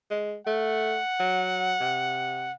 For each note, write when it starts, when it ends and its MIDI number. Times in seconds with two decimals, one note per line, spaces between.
0.10 0.35 56
0.47 0.98 57
0.47 2.53 78
1.20 1.75 54
1.80 2.51 48